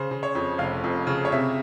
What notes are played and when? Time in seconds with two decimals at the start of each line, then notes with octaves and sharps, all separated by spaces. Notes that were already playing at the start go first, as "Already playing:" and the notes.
Already playing: C#3 C5
0.11 C#3
0.23 C#5
0.35 F2
0.58 F1 F5
0.84 F2
1.07 C#3
1.25 C#5
1.32 C3 E5